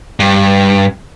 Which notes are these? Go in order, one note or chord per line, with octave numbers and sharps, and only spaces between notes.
G2